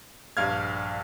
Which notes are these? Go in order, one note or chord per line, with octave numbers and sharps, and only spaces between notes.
A#1 G2 F5 F6 G#6